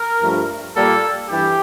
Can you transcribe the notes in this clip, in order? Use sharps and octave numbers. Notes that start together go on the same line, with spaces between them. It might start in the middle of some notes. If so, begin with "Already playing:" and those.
Already playing: A#4
G2 F3 A3
A#2 G3 A#3 A4
G2 E3 G4